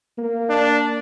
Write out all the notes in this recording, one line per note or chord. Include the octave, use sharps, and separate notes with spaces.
A#3
D4